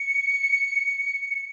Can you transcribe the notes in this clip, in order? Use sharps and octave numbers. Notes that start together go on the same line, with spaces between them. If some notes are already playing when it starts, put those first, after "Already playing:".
Already playing: C#7